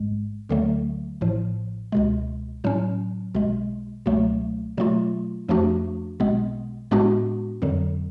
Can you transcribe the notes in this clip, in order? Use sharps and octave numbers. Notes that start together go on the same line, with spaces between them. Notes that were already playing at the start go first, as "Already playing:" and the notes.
Already playing: A1 G#2 G#3
D2 D3 F#3 A3
A1 A2 F3
C#2 B2 G#3
A2 F#3 C#4
B1 B2 G#3
C#2 B2 F#3 A3
B2 F#3 A3 F4
F2 F3 A3 D4 F#4
B1 B2 G#3 B3
A2 G#3 B3 D4 F#4
F2 D3 F#3